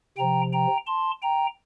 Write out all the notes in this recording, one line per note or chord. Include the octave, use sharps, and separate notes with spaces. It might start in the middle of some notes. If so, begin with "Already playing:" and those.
C3 F3 G5 A#5
G5 A#5
A5 C6
G5 A#5